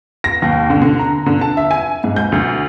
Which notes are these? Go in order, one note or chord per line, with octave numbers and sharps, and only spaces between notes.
A#6
D#2
D3
D3
A#5
D3
A5
E5
G#5
G#2
G6
D2